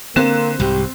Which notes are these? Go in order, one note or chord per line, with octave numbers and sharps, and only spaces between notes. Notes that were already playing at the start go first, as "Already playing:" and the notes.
D3 A#3 C4 F#6 E7
C2 G#2 G4